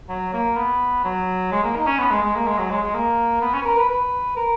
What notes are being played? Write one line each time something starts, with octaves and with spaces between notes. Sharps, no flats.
F#3
A#3
B3
F#3
G#3
A#3
D#4
C#4
B3
G#3
G#3
A#3
G#3
F#3
G#3
G#3
A#3
B3
C#4
B4
A#4
B4
B4
A#4